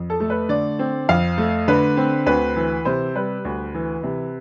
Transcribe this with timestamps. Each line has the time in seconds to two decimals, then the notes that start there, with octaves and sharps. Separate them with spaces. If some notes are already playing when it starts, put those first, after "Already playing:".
Already playing: F2
0.10 A4
0.20 A3
0.30 B4
0.49 D3 D5
0.79 C4
1.09 F2 F5
1.38 A3
1.68 D3 B4
1.97 C4
2.26 D2 B4
2.56 E3
2.85 C3 C5
3.15 G3 B4
3.45 D2
3.75 E3
4.03 C3